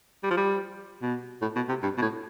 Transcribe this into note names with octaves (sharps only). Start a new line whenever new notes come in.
G3
F3
G3
B2
A2
B2
C3
G2
B2
A2